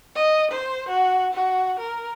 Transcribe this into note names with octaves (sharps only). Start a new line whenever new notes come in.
D#5
C5
F#4
F#4
A#4